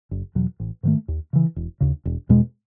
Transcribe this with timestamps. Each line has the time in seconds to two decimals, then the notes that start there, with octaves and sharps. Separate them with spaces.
0.11 F#1
0.35 E2 B2 F#3
0.60 A1
0.83 G#2 D#3 A3
1.08 D#2
1.33 C#3 E3
1.56 E1
1.81 D#2 C#3
2.05 E1
2.29 E2 B2 G#3